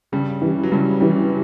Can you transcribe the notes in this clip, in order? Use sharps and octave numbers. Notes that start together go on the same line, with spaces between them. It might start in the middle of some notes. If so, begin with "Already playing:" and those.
G2 C#3 G3
E3 G3
F#3
G2 C#3 G3
E3 G3